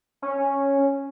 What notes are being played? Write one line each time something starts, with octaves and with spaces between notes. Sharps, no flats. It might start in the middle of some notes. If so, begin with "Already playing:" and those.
C#4